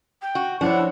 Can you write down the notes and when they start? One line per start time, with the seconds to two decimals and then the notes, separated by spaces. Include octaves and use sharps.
0.22 G5
0.35 F#4
0.61 F3 D4 E4 C5 C#5 F#5